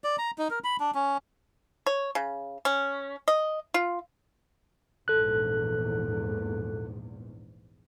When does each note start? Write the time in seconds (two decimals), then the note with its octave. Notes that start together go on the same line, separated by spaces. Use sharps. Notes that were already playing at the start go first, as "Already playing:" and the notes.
0.04 D5
0.18 A#5
0.38 D#4
0.50 A#4
0.64 B5
0.80 D4
0.95 C#4
1.86 C#5
2.15 C#3
2.65 C#4
3.28 D#5
3.74 F4
5.08 A#1 E2 G#2 A4 F#6